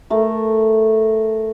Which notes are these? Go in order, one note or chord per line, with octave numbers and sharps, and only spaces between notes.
A3 A#4